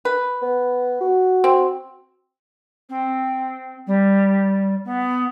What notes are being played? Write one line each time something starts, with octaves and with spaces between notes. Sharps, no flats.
B4
B3
F#4
C4
C4
G3
B3